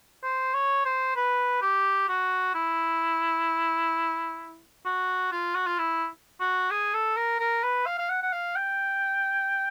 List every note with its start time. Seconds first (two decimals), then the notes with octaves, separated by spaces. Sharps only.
0.24 C5
0.54 C#5
0.85 C5
1.16 B4
1.62 G4
2.08 F#4
2.54 E4
4.86 F#4
5.32 F4
5.55 F#4
5.67 F4
5.78 E4
6.40 F#4
6.71 G#4
6.94 A4
7.17 A#4
7.40 A#4
7.63 B4
7.86 F5
7.99 F5
8.10 F#5
8.22 F#5
8.33 F5
8.56 G5